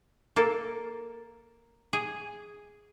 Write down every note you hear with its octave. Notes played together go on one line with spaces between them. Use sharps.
A#3 A4
G#4